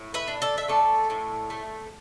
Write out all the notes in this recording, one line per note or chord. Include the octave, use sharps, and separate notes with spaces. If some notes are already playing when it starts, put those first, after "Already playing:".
Already playing: A2
B4 E5
D4
A4 D5
E5
A3 A4 D5
A2
A3